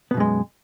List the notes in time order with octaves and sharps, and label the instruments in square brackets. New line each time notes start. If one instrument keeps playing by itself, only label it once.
[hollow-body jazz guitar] B3
B2
F#2
G#3